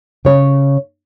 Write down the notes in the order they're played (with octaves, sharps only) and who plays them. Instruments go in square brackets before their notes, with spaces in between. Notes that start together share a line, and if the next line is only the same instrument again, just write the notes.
[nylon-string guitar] C#3 C#5